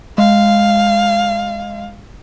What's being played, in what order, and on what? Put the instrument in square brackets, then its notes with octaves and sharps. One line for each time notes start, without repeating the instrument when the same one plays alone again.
[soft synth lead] G#3 [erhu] F5